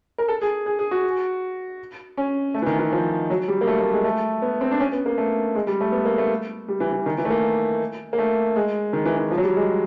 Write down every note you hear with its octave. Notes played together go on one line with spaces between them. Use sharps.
A#4
A4
G#4
G#4
G#4
F#4
C#4
A3
E3
D#3
E3
F3
F#3
G3
A#3
A3
A3
G#3
A3
B3
C4
D4
C#4
B3
A#3
A3
G#3
G3
A3
B3
A#3
A3
G3
E3
E3
D#3
E3
A3
A#3
A#3
A3
G#3
D#3
E3
E3
F3
F#3
G3
G#3